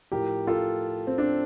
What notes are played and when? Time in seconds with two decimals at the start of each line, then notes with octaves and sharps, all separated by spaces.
0.12 A2 F3 G4 A#4
0.47 F4 A4
1.07 C4
1.18 D4